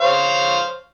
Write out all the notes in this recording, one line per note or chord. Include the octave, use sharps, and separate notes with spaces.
C5 C#5 F5